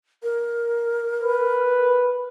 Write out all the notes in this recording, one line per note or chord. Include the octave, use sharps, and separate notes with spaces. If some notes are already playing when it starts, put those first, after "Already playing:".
A#4
B4